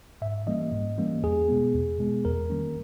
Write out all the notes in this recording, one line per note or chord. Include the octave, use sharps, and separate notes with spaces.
G#2 E5
E3 G3 A#3 C#4 D#5
G#2
E3 G3 A#3 C#4
E2 G#4
B2 G#3 B3
E2
B2 G#3 B3
E2 A#4
D#3 G3 A#3 C#4